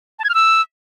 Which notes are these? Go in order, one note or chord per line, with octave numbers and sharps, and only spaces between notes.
A5
G#6
F6
E6